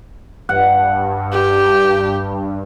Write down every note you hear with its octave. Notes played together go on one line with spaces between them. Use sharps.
G2 F#5
G4